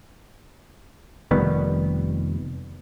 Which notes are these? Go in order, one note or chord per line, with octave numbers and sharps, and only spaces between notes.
F1 D#3 G3 B3